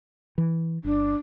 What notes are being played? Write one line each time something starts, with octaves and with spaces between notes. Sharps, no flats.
E3
G1 D4